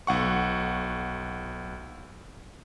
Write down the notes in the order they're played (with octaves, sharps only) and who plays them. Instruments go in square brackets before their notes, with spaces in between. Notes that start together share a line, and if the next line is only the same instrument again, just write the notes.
[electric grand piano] B1 F#5 C#6